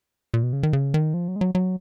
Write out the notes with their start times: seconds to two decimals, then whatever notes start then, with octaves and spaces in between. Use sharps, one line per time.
0.34 A#2
0.43 B2
0.53 C#3
0.63 D#3
0.73 C#3
0.94 D#3
1.14 F3
1.28 F#3
1.36 G#3
1.41 F#3
1.55 F#3